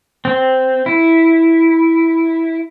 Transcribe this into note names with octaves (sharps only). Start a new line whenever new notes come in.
C4
E4